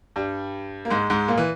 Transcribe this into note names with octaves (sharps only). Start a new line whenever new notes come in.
G2 G3
A#3
G#2 G#3
G#2 G#3
A#2 A#3
E3